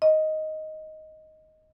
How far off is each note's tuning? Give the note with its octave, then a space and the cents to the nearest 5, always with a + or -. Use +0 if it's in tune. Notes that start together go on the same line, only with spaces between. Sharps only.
D#5 +5